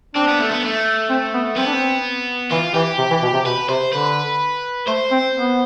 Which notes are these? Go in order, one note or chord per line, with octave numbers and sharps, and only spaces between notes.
C4 D4
B3
A3
B3
A3
C4
B3
B3 C4
D4
C4
E3 F4
E3 G4
C3
E3
B2
C3
B2 B4
C3 C5
D3 B4
A3 C5
C4
B3